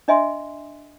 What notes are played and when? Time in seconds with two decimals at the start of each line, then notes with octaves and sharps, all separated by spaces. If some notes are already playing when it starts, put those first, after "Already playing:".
0.08 D4 D#5 E5 G#5 C6